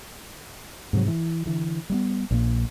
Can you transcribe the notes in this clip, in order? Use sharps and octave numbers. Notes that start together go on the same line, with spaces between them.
G#2 C3 E3 F#3
E3
D3 E3
G3 A3 B3
A#1 A#2 A#3